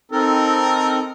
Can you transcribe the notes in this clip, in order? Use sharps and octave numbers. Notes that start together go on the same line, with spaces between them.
C4 D#4 A4 A#4